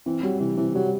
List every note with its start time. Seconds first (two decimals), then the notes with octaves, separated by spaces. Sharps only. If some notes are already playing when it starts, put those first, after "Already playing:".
0.06 E3 C4
0.23 F#3 G3
0.40 C3 E3
0.57 C3 E3
0.74 F#3 G3